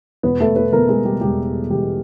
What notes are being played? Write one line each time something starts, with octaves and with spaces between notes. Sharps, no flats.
E1 E2 B2 B3 B4
A3 A4
B3 B4
E1 E2 B2 A#3 A#4
G#3 G#4
G3 G4
E1 E2 B2 G3 G4
E1 E2 B2 G3 G4